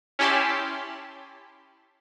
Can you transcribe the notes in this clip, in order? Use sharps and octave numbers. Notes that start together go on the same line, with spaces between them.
C#4 E4 G4 A5 B5 C6